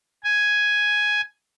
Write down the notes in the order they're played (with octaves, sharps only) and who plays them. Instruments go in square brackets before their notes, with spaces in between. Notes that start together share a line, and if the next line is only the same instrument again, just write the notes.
[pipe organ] G#5